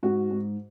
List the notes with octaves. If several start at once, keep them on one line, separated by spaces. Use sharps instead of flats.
G#2 F#4
G#2